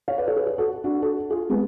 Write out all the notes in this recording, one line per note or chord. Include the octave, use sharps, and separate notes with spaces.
C#5 F5
B4 D5
A4 C#5
G#4 B4
G#4 B4
F#4 A4
D4 F#4
F#4 A4
F4 G#4
G#3 B3